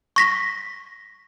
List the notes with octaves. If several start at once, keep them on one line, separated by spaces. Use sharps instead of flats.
C#6 A#6 B6